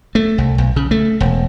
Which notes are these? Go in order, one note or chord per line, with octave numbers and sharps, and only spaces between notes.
A3
C2
B1
C#3
A3
E1